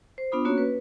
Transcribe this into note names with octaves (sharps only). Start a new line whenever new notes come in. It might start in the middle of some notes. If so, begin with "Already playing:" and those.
C5
B3 D4 F4 B5 D#6
A#3 C#4 F#4 C#5
B4